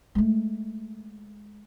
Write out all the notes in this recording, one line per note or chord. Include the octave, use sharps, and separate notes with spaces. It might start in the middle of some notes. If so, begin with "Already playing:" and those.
G#3 A3